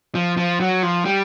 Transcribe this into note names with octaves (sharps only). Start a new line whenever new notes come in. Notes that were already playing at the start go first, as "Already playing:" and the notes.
F3
F3
F#3
F3
G3